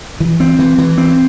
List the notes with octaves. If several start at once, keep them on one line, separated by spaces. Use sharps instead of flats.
E3
C4
E3
E3
C4